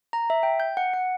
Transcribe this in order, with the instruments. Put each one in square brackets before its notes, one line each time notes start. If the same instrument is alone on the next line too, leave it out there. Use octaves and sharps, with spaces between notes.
[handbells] A#5
E5
G5
G6
F#5
F#5